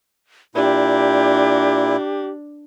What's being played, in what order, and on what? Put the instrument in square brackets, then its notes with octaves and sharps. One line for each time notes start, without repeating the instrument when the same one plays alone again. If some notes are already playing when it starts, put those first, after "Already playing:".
[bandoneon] A#2 E4 [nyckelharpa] D4 [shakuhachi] G4